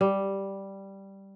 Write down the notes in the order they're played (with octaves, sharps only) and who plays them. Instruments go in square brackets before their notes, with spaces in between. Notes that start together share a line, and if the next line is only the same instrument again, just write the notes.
[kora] G3